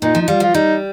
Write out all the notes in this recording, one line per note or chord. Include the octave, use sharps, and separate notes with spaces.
A#2 D#4
F3
D#4
G3 F4
F3 F4
G3 D#4